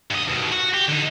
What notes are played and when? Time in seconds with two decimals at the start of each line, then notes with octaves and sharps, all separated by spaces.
0.11 G2 D#5
0.28 D#2 B2
0.52 F#4
0.74 G4
0.88 D3 D#4